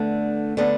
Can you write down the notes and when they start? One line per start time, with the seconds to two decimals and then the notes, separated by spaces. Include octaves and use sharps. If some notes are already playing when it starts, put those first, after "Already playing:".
Already playing: D3 A3 B3 D4
0.57 D3 B3 D4